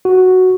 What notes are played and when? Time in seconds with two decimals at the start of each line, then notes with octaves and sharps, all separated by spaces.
0.05 F#4